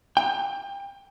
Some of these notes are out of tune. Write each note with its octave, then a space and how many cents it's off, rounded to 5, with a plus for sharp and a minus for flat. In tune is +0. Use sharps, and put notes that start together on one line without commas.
G5 +25